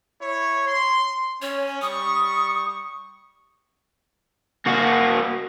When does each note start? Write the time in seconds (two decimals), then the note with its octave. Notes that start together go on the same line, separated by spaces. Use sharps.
0.21 E4 C#5
0.68 C6
1.42 C#4 C#5
1.82 G3 C#6 D#6
4.67 A#3 F#4